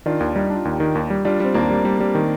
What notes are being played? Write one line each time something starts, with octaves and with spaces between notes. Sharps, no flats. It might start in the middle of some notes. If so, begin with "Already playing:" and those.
D#3 D4 F4
D#2
G3 D#4 G4
D4 F4
D#2 D#4 G4
D#3
D#2
G3
G3 D4 F4
G3 C4
D#2 A#3 D4
G3
G3
G3
D#3